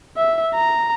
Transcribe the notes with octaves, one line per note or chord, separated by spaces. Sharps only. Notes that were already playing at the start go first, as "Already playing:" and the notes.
E5
A#5